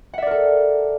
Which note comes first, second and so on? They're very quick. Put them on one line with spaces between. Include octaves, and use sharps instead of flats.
F#5 E5 D5 A#4 A4